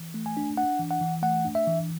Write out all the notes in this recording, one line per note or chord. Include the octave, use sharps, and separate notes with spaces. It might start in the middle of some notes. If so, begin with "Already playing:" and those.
Already playing: E3
A3
G#5
D4
D4 F#5
E3
F#5
E3
A3 F#5
D4
E5
E3